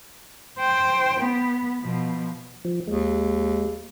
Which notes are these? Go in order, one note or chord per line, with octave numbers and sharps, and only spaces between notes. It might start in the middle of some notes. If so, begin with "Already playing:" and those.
C5 G5
B3
B2 F3
F3
D#2 G#3